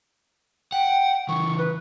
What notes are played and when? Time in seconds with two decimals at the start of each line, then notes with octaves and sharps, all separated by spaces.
0.72 F#5 G5
1.29 C#3 E3 C#6
1.58 B4